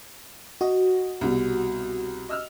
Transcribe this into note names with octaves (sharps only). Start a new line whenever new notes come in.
F#4 D#5
C2 B2 G3
D#5 E6 F6